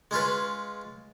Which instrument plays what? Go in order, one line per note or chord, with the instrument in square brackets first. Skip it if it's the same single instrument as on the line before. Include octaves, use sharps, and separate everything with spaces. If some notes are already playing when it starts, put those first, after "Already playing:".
[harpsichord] G#3 C#4 F4 B4